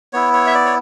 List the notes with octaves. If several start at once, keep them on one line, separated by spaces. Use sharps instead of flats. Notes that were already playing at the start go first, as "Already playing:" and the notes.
B3 E4 C#5
C#5
E5
D5
C#5